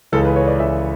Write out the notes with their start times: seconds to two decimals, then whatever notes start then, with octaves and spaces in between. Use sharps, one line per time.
0.12 C#2 C#3 E3 A4
0.25 B4
0.36 C#5
0.48 D5
0.60 C#2 C#3 E3 E5